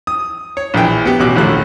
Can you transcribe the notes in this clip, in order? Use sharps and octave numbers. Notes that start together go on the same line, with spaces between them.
D#6
C#5
A#1 E3 G5
B3 G4
A1 B2 D6 F#6
A#1 D#2 D3 A3 F4 F#6